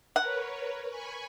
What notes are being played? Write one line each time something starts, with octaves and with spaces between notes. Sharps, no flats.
A#4 B4 C#5 F#5
G#5 B5 C#6